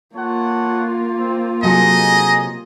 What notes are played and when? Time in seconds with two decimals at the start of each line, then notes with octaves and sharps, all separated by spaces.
0.16 A#3 F4 A4 C#5 F#5
1.18 C4
1.62 C3 F#3 D#4 G#4 A4 D#5